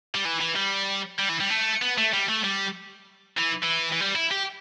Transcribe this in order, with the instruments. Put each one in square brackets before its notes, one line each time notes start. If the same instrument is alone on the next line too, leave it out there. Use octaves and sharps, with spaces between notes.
[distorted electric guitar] G3
E3
E3
G3
G3
E3
G3
A3
B3
A3
G3
A3
G3
E3
E3
E3
G3
E4
G4